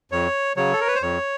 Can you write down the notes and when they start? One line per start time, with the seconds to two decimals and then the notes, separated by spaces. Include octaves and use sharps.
0.12 F2 C#5
0.57 C#3 F#3 C#5
0.73 A4
0.80 A#4
0.87 B4
0.95 C5
1.02 F2 C#5